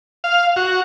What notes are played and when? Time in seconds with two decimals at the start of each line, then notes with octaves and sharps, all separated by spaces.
0.24 F5
0.56 F#4